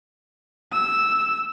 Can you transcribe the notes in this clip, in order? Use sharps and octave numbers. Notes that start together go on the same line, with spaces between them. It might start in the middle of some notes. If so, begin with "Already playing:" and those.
E6